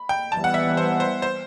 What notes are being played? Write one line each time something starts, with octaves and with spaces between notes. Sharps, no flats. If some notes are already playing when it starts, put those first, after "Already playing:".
Already playing: B5
G5
E3 G3 B3 A5
F#5
E5
C5
C5
C5